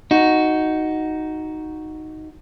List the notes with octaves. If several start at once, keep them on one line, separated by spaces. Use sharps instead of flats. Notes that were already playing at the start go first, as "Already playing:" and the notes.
D#4 F#4